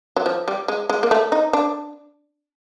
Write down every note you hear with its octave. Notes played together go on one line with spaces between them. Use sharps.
F#3
F3
G3
G#3
G#3
A#3
A3
D#4
D4